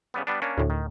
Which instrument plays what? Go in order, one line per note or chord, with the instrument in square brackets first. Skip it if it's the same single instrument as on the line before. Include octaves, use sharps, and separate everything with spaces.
[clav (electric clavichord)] C#3 G3 B3
G3 B3 D4
A#3 C#4 D4
[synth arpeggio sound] D2 A2
[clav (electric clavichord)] D#3